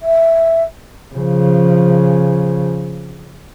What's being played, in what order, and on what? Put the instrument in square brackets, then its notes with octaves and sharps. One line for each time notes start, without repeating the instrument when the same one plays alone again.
[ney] E5
[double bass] C#3 F3